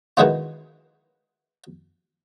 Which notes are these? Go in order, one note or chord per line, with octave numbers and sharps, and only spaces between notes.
B2 D#3 E3 G#3 B3 F4